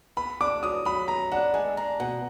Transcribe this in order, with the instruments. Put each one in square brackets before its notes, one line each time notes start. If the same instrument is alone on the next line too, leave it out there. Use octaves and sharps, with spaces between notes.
[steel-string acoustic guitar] B3 [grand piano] B5
[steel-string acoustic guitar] D4 [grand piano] D6
[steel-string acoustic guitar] F#3 [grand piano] D#6
[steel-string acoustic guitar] F#3 [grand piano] B5
[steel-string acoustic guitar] B3 [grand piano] A#5
[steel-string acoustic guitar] D4 [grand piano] F#5
[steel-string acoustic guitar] G#3 [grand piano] G#5
[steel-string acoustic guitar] D4 [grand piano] A#5
[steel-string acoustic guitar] B2 [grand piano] F#5